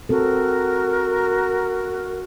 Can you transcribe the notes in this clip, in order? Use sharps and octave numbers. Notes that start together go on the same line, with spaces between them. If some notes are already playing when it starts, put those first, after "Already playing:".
C4 F#4 A4 A#4